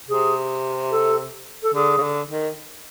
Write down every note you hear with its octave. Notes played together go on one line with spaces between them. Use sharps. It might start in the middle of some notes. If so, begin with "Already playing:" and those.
C3 G#4
A4
A4
D3 G#4
C#3
D3
D#3